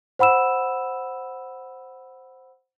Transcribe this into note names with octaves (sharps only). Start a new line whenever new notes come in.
C5 F#5 B5 E6 E7